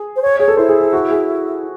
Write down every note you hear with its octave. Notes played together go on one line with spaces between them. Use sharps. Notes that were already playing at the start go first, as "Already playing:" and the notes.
Already playing: G#4
C5
C#5
G#4 C#5
A4
E4 C5
G#4
G#4
F#4
G#4